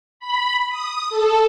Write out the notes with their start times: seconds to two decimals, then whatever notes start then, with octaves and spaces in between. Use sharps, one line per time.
0.20 B5
0.69 D#6
1.10 A4